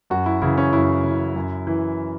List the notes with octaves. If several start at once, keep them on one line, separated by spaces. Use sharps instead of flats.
F#2 F#4
E4
C#3 E3 E4
C#4
F#2 E4
C#3 E3
F#2
E3